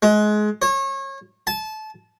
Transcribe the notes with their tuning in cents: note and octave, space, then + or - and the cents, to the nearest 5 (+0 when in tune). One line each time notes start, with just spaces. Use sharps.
G#3 +25
C#5 -30
A5 -25